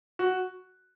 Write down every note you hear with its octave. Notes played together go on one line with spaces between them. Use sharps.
F#4